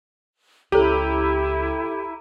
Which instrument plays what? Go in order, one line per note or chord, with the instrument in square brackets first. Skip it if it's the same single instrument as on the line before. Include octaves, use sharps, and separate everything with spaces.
[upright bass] C#2 [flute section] E4 [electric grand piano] G4 [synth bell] A4 A#5 D#7